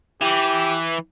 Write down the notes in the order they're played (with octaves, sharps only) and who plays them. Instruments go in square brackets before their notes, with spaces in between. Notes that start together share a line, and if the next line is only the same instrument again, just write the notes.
[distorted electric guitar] E3 [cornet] G4